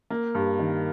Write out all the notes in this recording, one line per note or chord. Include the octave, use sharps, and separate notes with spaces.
A#3
G2
D#3